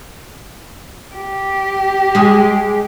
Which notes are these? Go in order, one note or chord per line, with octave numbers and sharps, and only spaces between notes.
G4
G#3 G#4